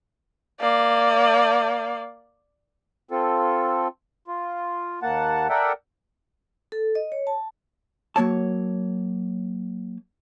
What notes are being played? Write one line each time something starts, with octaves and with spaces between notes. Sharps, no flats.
A#3 D5
C4 F4 A4
F4
D#2 A#3 F#5 A5
A4 A#4 D5 E5 F#5 G5
A4
D#5
C#5
A5
F#3 A#3 C#5 A5